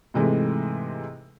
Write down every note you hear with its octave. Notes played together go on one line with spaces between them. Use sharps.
G#2 C3 E3 G#3 A3